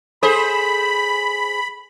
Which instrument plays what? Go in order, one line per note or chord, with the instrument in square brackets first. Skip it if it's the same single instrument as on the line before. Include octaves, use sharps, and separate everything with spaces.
[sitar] G#4 C5 [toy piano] A4 [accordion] B5